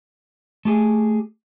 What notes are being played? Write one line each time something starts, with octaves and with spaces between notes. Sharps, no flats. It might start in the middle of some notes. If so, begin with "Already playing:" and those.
A3 G4 G#4